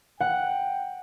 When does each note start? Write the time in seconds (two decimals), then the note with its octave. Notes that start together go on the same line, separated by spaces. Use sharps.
0.20 F#5 G5